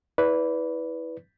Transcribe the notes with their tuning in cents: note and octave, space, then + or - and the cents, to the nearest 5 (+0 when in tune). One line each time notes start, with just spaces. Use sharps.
E4 -20 B4 +0 D5 -30